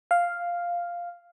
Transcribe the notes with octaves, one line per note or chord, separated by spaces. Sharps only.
F5